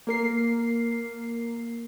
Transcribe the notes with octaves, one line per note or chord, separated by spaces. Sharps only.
A#3 A#4 C7